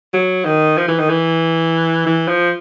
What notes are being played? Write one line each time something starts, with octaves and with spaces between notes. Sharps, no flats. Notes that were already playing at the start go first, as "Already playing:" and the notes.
F#3
D#3
F3
E3
D#3
E3
E3
F3